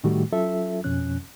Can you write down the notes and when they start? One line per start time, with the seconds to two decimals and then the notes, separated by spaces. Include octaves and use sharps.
0.04 A2 D#3 G3 A3 F#4 G4
0.32 F#3 C#4 F4 A4 E5
0.84 F2 B2 F3 C#4 F#6